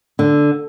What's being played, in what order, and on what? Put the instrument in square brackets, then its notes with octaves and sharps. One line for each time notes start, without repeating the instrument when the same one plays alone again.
[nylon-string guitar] D3